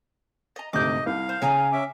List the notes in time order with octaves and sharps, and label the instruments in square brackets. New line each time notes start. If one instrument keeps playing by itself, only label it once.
[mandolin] D#5 A#5
[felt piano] G#1 D2 C3 [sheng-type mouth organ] D#5 [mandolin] D6 G6
[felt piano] C2 [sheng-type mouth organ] F5
[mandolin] C5
[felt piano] C#3 [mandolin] C#5 G#5 A#5
[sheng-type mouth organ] C#4 E5 D6